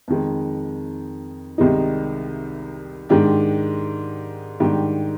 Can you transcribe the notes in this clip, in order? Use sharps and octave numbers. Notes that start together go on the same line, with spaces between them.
F2 D#3 G#3
C2 C3 D#3 G#3 D#4
G#2 D#3 G#3 D4 G4
G#2 D#3 G3 D4 G4